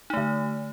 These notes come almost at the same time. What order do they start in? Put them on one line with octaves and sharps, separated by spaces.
D#4 A3 D3